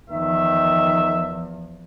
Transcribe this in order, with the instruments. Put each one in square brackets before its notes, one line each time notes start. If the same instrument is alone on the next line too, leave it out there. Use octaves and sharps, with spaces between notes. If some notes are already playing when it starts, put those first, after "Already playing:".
[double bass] E2 F3 [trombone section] D#3 [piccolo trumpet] E5